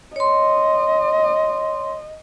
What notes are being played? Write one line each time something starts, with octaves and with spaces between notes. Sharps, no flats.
C#5 D#5 C6